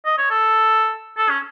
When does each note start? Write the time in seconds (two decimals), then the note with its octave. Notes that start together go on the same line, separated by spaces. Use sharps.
0.06 D#5
0.18 C#5
0.30 A4
1.18 A4
1.30 C#4